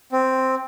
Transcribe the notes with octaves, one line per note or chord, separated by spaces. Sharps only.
C4